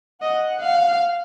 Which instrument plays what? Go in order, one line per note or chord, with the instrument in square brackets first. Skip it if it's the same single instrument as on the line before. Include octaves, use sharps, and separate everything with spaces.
[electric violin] D#5 [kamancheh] F#5
[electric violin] F5